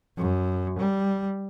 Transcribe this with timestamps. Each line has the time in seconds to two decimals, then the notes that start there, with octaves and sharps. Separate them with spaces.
0.17 F#2
0.79 G3